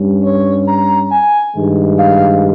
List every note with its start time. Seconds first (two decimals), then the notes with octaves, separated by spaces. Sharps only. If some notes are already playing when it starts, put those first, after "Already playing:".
Already playing: G2 G3 C#4
0.24 C#5
0.68 A#5
1.12 G#5
1.56 G2 D#3 G#3
1.99 F5